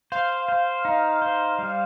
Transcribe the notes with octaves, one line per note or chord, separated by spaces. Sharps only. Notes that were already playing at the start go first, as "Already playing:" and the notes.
C5 F5
C5
D#4
C5
G3